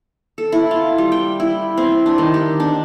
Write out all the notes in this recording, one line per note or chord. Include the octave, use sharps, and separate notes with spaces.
A4
E4
F4
G3
G5
E4
C4
D4
D#3
G4
D4